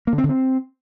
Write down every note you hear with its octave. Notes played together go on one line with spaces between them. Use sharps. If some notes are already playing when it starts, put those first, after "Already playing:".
A#3
D3
C4
D3
C4